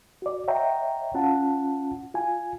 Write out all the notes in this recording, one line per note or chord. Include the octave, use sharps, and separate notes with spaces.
F#4 D5
C#5 D#5 E5 F#5 G5 A#5
C#4 F4 F#5 A5
F4 G#5